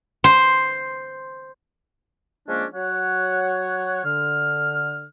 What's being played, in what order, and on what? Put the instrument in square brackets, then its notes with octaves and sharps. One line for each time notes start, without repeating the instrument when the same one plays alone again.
[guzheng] C5
[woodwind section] F3 G#3 A#3 C#4 D4
F#3 C#5 F#5
D3 F6